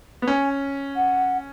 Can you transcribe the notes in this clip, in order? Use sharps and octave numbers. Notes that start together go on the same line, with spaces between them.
B3
C#4 G#5
F#5